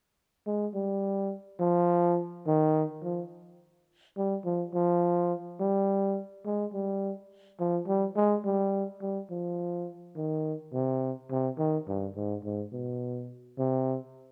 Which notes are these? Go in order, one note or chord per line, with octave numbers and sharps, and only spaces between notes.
G#3
G3
F3
D#3
F3
G3
F3
F3
G3
G#3
G3
F3
G3
G#3
G3
G3
F3
D#3
C3
C3
D#3
G2
G#2
G#2
B2
C3